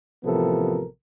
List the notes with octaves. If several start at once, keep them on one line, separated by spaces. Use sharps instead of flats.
A1 C3 F3 B3 A4 A#4